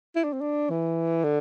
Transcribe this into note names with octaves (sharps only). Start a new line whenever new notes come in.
E4
D4
C4
D4
E3
D3